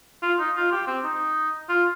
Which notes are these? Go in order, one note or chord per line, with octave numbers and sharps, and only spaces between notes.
F4
D#4
F4
G4
C4
D#4
F4